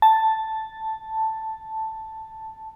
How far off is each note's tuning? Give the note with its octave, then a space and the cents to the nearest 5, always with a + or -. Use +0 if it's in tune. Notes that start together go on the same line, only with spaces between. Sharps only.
A5 +0